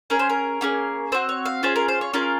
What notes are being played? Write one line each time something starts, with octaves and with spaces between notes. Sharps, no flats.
C#4 G#4 A#4
C5
A#4
A#3 C#4 G#4
C4 F#4 C5
C#5
F5
C#4 F4 G#4 C5
A#4
C5
C#5
C#4 F4 G#4 A#4